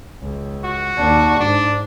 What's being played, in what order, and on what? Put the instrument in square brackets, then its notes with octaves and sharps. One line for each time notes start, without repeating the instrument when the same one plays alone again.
[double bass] C#2
[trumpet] F#4
[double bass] D#2 D4
[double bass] G#2 [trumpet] D4